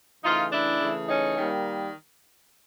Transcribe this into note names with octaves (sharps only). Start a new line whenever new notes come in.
C#3 E3 A3 D#4 F4
D4 E4
C#3 E3 A3
C#4 D#4
D#3 G3 A#3